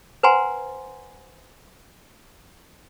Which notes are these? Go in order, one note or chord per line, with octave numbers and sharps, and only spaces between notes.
B4 C5 F#5 G#5 A#5 C6